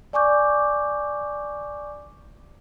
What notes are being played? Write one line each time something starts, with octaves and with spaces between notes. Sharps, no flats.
D5 G#5 C#6 D6 G6